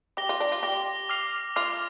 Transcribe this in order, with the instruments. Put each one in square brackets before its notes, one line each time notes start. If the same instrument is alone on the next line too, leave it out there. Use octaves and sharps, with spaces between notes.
[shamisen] G4 [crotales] D6 A#6 G7
[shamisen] F4
D4
F4
[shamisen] G4 [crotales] D6 A#6 G7
[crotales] D6 F6 C7 F7
[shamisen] F4 [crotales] D6 F6 C7 F7